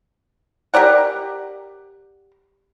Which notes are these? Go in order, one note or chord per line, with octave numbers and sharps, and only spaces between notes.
G4 A#4 D5 F#5